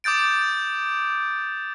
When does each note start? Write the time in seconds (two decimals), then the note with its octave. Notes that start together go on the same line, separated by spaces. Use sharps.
0.04 D6 D#6 G6 A6 D7